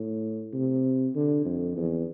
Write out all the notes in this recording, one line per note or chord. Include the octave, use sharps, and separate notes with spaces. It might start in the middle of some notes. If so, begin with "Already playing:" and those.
Already playing: A2
C3
D3
F2
E2